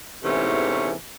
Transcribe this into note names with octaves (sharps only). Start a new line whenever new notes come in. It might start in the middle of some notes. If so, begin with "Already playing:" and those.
E2 G#2 C3 E3 A3 C#4